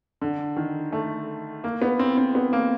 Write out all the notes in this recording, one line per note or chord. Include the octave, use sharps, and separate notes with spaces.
D3
D#3
A3
A#3
B3
C4
C4
B3
A#3